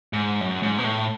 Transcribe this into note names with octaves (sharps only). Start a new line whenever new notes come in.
G#2
F#2
G#2
B2
A2